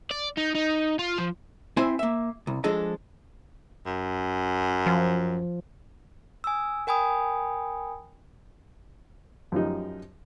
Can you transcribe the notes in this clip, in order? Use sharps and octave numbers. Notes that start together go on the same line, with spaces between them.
D5
D#4
D#4
F4
F3
C4 E4 C5 E5 G#5
A#3 E5
C2
F3 G#3 D4 G#4 A4 D#5
F#2
F3
G#5 D#6 E6
A#4 G5 G#5 B5 D#6
F#2 F3 G3 D#4